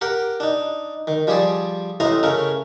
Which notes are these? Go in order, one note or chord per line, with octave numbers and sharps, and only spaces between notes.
G4 A#4 F#5 G5
D4 D#4
D#3
F3 G3 G4 G#4 C5 D5
A1 A2 E4 D#5 A#5 C6
C#3 A3 C#4 A#4